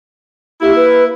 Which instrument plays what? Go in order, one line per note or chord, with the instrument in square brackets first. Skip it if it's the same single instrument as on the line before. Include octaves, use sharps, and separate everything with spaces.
[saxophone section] A#3 E4 [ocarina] G4
[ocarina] B4